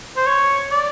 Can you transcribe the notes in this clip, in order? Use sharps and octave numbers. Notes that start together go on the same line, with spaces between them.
C5
C#5
D5